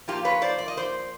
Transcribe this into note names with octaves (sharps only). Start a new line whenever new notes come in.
A#2 F3 A#3 F4 G4
B4 C#5
C5 D5
D5
D#5
C5 D5